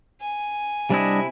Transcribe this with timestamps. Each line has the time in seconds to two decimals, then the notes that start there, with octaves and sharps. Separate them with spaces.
0.21 G#5
0.90 C3 G3 D4 E4 D#5